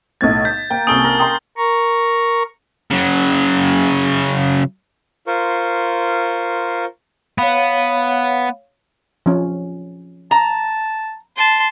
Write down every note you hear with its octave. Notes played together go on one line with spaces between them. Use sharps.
B1 A2 G#6 A6
G6 B6
A#3 G5
C2 C#4 A4 D#6 D7 G7
A#4
G5 A#5 C6 D#6
A#4 A#5 C#6
C#3 F#3
F4 A#4 C5 C#6
B3 C#5 F5
F3 C#4
A5 A#5
A5 C6